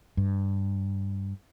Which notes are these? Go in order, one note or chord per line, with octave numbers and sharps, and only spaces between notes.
G2